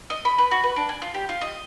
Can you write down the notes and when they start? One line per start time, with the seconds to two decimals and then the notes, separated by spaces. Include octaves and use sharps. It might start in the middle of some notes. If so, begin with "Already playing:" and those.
0.10 D#5
0.25 B5
0.38 B4
0.51 F#4
0.64 B4
0.76 D4
0.89 G#5
1.02 F4
1.14 G4
1.29 F4
1.41 D#5